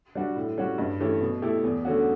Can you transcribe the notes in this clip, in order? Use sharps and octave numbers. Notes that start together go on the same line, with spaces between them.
G3 D4 F#4
A2
G3 C#4 F#4
G2
E3 A3 C#4 G4
B2
A3 E4 G4
E2
D3 A3 C#4 F#4